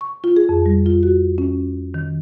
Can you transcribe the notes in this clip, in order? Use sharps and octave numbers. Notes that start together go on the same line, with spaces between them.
C#6
F4
G#4
F2
G3
F4
F#4
C#4
D#3